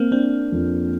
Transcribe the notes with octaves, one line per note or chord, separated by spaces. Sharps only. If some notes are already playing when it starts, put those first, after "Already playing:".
Already playing: A#3 C4
C4 D4
F2